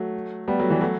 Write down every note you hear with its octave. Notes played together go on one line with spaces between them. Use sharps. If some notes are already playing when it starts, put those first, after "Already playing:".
Already playing: F#3 A3
G3 B3
F#3 A3
E3 G3
F#3 A3